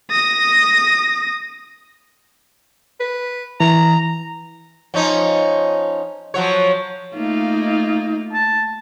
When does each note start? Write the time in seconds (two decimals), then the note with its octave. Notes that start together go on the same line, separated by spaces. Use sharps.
0.11 D#6 A#6
3.00 B4
3.60 E3 A#5
4.94 F3 C#4 D#4
6.34 F3 F#3 C#5
7.14 A3 A#3 D#4 F4
8.33 A5